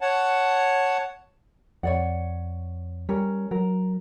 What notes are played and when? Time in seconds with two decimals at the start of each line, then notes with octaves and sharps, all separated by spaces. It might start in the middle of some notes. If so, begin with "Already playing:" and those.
0.01 C#5 F#5 A5
1.83 F2 C#5 D5 F#5
3.09 G3 C#4 A#4
3.51 F#3 A#4